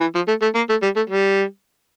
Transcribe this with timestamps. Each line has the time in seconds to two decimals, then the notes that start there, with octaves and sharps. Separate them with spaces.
0.01 E3
0.15 F3
0.28 A3
0.42 A3
0.55 A#3
0.69 A3
0.82 G3
0.96 A3
1.10 G3